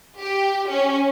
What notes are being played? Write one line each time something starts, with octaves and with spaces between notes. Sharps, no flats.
G4
C#4